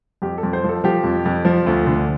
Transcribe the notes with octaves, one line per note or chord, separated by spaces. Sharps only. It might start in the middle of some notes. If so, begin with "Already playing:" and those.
F2 G4
A4
F2
C5
F3
A4
F3 G4
F2
F2
F3
D2
D3